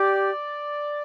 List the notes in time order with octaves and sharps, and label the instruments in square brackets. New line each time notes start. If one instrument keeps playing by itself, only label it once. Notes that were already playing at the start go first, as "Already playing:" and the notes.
Already playing: [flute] G4 [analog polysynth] D5